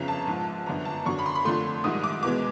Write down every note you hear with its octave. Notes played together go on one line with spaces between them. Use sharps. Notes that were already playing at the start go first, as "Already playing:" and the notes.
Already playing: G1 F2 C#3 A#5
A5
A#1 G#2 F3
G1 F#2 D3 A#5
A5
F#2 D3 F#3 C#6
B5
C6
B5
F2 D3 F3 A3 C6
A#1 G#2 D#3 G3 D#6
D6
E2 B2 G#3 D6